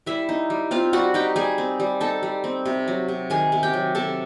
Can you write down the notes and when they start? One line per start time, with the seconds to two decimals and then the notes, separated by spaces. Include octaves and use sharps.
0.06 G3 E4 E5
0.29 D#4
0.50 G3
0.71 C4 F4 F5
0.93 G3 F#4 F#5
1.14 D#4 G4 G5
1.36 G3 G#4 G#5
1.58 C4
1.80 G3
2.01 D#4 A4 A5
2.23 G3
2.44 C4
2.66 C3
2.88 F#3
3.08 C3
3.30 D#3 G#4 G#5
3.52 C3
3.63 G4 G5
3.73 F#3
3.95 C3 A4 A5